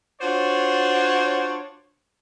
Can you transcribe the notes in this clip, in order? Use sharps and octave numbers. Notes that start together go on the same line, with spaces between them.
D4 F4 F#4 C5 C#5